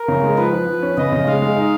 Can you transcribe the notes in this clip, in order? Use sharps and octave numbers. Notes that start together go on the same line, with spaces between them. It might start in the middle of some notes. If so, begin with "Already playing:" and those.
Already playing: A#4
C#3
G#3
F3 B4
F3
F3
C#4
C#3 D#5
C#3
G#3 F5
G#3
D#4